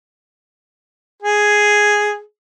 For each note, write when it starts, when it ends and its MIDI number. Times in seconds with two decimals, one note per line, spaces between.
1.22 2.18 68